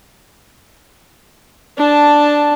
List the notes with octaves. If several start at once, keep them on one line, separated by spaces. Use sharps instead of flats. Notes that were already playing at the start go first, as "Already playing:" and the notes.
D4 A5